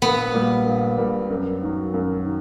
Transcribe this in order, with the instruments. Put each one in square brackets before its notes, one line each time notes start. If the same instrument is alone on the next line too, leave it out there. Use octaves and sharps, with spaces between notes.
[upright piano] A#1 [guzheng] B3
[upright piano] A#2 G3 A#3
A#1
A#2 G3 A#3
F#2
D#3 F#3
F#2
D#3